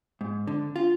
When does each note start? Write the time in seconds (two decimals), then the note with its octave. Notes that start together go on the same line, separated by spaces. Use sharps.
0.21 G#2
0.47 D3
0.76 F4